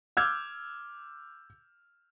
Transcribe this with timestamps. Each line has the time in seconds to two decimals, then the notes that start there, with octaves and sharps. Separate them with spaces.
0.17 D6 E6 F6 G6 G#6